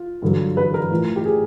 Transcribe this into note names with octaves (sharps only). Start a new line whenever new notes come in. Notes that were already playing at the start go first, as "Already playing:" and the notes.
Already playing: F4
G2 D3 F#3
B4
A#4
A2 F3
G4
G#4